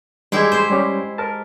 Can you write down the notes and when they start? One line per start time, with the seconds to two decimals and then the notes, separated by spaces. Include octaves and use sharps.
0.32 G3 G#3 E4 G4 G#4
0.52 C5
0.70 G3 C#4 G4
1.18 A#4 A5